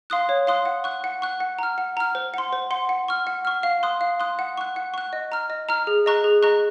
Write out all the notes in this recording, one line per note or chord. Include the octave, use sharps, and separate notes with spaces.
F5 C6 D#6 F#6
C#5
F5 C6 D#6 F#6
F#5
C#6 F#6
F#5
C#6 F#6
F#5
A#5 F6
F#5
A#5 F6
C5
F#5 C6
C5
F#5 C6
F#5
C#6 F6
F#5
C#6 F6
F5
C6 D#6 F#6
F5
C6 D#6 F#6
F#5
C#6 F#6
F#5
C#6 F#6
D#5
A#5 F6
D#5
A#5 F6
G#4
D#5 A#5 C#6 F#6
G#4
D#5 A#5 C#6 F#6